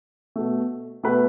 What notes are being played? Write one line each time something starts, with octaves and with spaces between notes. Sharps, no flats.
B2 A3
B2 A3 B4